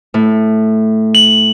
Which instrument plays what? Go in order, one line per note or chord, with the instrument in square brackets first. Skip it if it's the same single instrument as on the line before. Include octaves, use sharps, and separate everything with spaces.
[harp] A2
[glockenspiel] F#7